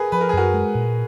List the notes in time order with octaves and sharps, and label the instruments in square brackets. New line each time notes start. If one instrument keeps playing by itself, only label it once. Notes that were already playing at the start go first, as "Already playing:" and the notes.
Already playing: [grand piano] G#4 A#4 B4
[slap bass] F3 [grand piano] B4
[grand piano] A#4
G#4
[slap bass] F#2 [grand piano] F#4 A#4
[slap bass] G#3
A#2